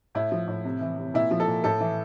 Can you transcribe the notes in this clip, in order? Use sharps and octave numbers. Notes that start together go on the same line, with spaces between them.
A2 E4
F3
A2
C3
E3
C3
A#2 E4
F3
A4
A#2
A2 A4
E3